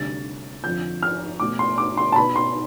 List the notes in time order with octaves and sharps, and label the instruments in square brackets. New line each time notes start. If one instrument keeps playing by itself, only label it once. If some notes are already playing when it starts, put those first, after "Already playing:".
Already playing: [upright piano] D2 C3 G3 A6
F2 D3 F3 G6
F6
B2 A3 D6
C6
D6
C6
A5
B2 B3 B5
C6